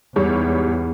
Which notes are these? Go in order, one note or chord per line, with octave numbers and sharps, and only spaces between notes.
E2 G#2 G3 C#5